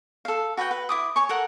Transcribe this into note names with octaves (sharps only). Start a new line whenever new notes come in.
A4 F5
F#4 B4 F#5 G5
B4
E4 D6 D#6
C#5 G#5 C#6
A4 A#4 F#5